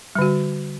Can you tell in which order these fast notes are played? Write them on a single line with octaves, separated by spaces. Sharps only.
G3 D3 F#4